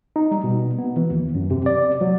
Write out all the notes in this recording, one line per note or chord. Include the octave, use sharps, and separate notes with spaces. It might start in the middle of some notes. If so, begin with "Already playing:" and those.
D#4
G3
B2
B3
E3
D#2
F#2
C3
D5
F#3